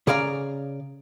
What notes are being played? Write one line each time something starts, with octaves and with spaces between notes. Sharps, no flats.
C#3 G#4 D5 F5 A#5